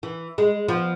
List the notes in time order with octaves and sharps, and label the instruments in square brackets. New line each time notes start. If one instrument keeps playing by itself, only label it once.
[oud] E3
G#3
F3 B3